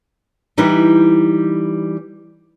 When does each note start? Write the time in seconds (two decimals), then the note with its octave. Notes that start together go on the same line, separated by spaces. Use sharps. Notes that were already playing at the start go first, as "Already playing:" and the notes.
0.58 E3 G3 D#4 E4 B4